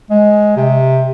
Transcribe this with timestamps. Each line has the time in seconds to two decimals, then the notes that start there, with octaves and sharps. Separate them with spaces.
0.10 G#3
0.57 C3